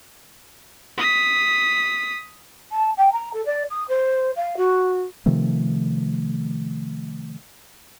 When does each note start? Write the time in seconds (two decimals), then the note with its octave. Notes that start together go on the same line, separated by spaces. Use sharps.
0.98 D#6 B6
2.72 A5
2.97 G5
3.12 A#5
3.33 A4
3.46 D5
3.70 D#6
3.88 C5
4.36 F5
4.57 F#4
5.26 C3 D#3 F3 A3